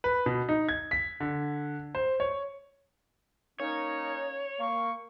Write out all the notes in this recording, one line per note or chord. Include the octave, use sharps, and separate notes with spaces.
B4
B2
D#4
G#6
B6
D3
C5
C#5
A#3 C#4 D#4 C#5
A#3 C#6